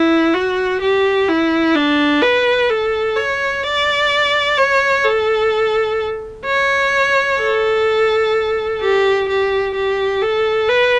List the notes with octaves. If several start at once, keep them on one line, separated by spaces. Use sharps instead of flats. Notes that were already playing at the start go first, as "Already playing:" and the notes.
Already playing: E4
F#4
G4
E4
D4
B4
A4
C#5
D5
C#5
A4
C#5
A4
G4
G4
G4
A4
B4